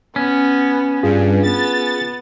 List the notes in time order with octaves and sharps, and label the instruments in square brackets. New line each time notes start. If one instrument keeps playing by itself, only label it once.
[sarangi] B3 [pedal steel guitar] C#4
[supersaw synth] G2 [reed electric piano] F4 G#4
[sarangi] B3 [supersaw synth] A6